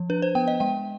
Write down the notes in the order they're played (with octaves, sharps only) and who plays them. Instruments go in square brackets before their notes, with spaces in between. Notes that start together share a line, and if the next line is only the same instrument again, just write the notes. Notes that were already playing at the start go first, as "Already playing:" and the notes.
Already playing: [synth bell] F3
D4 B4
C5
B3 G5
D#5
G#3 G5